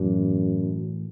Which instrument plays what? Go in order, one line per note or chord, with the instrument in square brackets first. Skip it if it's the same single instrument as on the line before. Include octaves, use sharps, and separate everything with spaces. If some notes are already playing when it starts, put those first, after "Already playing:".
Already playing: [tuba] F#2 [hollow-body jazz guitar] A2 E3 D4